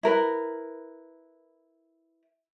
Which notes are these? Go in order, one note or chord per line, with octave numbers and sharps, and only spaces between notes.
E4 A#4 B4